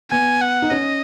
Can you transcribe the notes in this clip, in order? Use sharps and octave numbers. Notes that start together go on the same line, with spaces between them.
B3 G#5
F#5
D#4
C#4 D#5